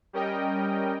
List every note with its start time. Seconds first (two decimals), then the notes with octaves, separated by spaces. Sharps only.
0.13 G3 C#4 A#4 D#5 G5